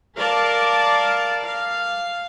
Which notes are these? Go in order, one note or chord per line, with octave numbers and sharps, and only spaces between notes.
A#4 D5 F5 A5
F5